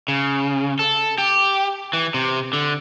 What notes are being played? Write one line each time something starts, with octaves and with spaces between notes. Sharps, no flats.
C#3
A4
G4
E3
C3
D3